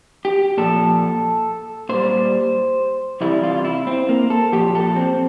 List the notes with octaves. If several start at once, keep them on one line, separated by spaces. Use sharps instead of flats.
G4
A#2 F3 A4
A#2 G3 C5
E2 C3 E3 G3 E4
F4
E4
C4
A#3
A4
A#2 F3 G4
A4
C4